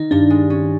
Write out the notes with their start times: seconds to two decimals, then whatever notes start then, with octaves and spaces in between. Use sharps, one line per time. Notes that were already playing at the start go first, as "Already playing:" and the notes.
Already playing: D#3 D#4
0.11 G2 D4
0.30 G#3
0.50 C#4